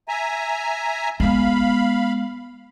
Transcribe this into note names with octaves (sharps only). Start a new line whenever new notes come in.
E5 G#5 A#5
G#3 B3 F5 B5